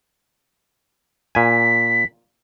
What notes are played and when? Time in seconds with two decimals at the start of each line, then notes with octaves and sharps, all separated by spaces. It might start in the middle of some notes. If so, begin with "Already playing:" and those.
1.35 A#2 G#5 B6